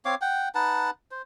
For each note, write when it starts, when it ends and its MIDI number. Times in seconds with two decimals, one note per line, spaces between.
0.05 0.15 60
0.05 0.15 73
0.05 0.15 77
0.05 0.15 86
0.21 0.49 78
0.21 0.49 79
0.55 0.90 63
0.55 0.90 71
0.55 0.90 78
0.55 0.90 81
1.11 1.22 72